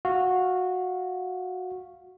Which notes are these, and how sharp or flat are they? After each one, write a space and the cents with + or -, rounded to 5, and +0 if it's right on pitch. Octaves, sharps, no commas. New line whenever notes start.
F#4 -15 F5 -10